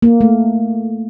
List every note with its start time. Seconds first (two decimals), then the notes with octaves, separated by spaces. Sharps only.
0.02 A#3
0.21 A3